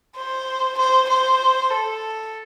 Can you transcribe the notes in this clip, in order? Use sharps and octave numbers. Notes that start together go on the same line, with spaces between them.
C5
C5
C5
A4